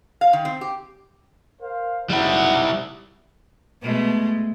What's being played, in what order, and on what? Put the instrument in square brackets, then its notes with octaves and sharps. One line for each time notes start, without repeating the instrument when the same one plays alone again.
[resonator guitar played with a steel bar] F5
D#3
C4
G4
[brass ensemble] A#4 C5 F5
[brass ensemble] F#1 D#4 F#5 [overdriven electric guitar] G3 E4
[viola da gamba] B2 G#3 A3